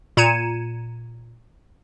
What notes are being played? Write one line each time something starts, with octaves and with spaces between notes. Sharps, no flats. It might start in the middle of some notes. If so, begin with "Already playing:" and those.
A#2 A#5 G#6 C#7 D#7 E7